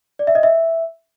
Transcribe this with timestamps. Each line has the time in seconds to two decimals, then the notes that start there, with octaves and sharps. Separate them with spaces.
0.19 D5
0.27 E5
0.35 D#5
0.43 E5